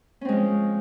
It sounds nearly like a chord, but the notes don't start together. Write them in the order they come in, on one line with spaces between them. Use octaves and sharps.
C#4 C4 G#3 F3